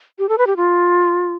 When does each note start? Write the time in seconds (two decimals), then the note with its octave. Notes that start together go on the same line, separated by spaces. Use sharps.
0.19 G4
0.29 A4
0.38 B4
0.47 G4
0.56 F4